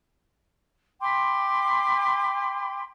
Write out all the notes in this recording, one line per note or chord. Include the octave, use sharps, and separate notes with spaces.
G5 B5 C6 D6